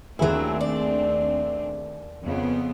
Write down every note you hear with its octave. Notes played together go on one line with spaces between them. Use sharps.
D#2 F#3 A3 C4 D4 E4 G#4
D5
F2 C#3 B3